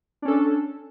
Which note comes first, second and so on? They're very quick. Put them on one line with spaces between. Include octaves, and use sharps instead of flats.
D4 C#4 A4